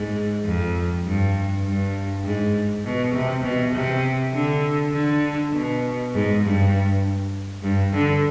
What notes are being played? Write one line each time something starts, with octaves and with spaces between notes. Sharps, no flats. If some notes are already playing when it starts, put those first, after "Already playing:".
Already playing: G#2
F2
G2
G2
G#2
B2
C3
B2
C3
D3
D3
B2
G#2
G2
G2
D3